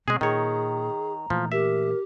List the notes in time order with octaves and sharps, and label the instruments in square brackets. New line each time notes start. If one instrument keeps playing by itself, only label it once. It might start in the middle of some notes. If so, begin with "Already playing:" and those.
[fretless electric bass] B2 C4 [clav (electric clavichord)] G#3 G#4
[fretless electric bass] A#2 [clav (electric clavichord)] D#3 C#5 [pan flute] G#4 [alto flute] A#5
[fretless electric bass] A#2 E3 A3 [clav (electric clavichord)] F3
[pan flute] G4 [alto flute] A#4 [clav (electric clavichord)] E5